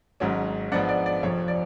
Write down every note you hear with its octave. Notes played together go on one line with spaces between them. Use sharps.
G#1 G#2 F#3 C#4
G#2 F3 B3 D4 D5 F#5
D5
D5
F1 F2 F3 C#5
D5